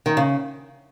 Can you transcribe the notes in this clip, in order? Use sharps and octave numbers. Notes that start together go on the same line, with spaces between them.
D#3
C#3